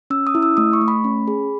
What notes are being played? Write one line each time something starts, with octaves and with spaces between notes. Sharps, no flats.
C#4 E6
D#6
E4
E6
A3 D#6
C#6
A3
B5
C#4
G#4